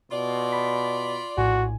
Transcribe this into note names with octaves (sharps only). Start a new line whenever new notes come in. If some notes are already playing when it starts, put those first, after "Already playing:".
B2 F4 D5 C6
B5 B6
A#1 A2 F#4 G#5